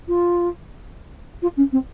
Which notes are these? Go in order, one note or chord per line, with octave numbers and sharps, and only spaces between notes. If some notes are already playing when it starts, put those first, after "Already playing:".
F4
F4
C#4
C4